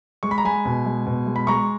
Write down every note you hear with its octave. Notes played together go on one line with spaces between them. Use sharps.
G#3 C#6
B5
A#5
G#3 G#5 B5
B2
G#3
B2
G#3
B5
G#3 A#5 C#6